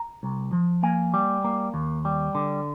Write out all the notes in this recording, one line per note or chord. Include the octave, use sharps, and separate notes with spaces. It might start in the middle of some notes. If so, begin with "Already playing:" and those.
Already playing: A#5
C2
F3
A#3 G#5
G3
A#3
D#2
G3
D3